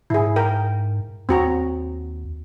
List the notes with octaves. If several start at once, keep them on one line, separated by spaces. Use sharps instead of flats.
G#2 E4 G#4
A#4 G5
D#2 C4 F#4 A#5